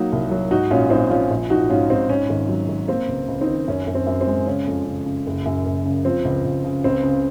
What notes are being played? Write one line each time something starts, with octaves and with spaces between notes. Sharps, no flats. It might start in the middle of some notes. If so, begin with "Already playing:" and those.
Already playing: F#3 A#3 D#4 F#4
C2
F#3
G#2 D#4 F#4
A#1 C#4 F4
A#1 C4 D#4
F3 C#4 F4
A#1
F3 D#4 F#4
G#2 C#4 F4
G#2 C4 D#4
G#2 C#4
G#1
F#3
G#1
A#3 C4
C#2
C#2
C4 D#4
D#3
F#2 C#4
F#2
C4
F#2
C4
G#3
C#3 C#4
F2
C#3
C#3
F#1
F#2
F#1
C#3
F3 C4
C#2
C#2
C#3
C#2 C4
C#3